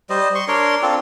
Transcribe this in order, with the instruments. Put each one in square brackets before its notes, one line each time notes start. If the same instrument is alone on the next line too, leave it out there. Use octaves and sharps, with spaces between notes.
[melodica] G3 C5 D#5
C6 C#6
D4 A#4 C#5 C6
C4 D4 F4 A4